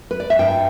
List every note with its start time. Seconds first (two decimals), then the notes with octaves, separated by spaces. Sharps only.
0.11 B4
0.20 D5
0.30 E5
0.39 G2 G5